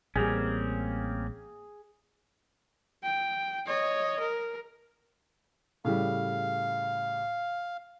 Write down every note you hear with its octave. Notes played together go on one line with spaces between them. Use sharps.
A1 G3 A#3 C4 C#4 G#4
G5
C#5 D#5
A#4
A2 C#3 G3 F5